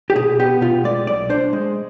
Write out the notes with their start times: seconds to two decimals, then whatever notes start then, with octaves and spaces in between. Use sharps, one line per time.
0.10 G4
0.16 B2 G#4
0.40 B3 G4
0.61 B2 F4
0.84 G#3 D5
1.07 B1 D5
1.30 D4 C5
1.53 G#3